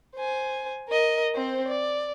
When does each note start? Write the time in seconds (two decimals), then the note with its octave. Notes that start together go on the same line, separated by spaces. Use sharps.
0.15 C5 G#5
0.88 A#4 D#5
1.35 C4 C5
1.68 D5